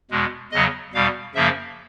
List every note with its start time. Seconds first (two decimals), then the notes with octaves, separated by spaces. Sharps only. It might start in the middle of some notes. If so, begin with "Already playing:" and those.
0.11 E2 B2 G#3
0.52 E2 C#3 F#3 D#5
0.93 E2 B2 G3 F5
1.34 F#2 C#3 F3 A#3 E5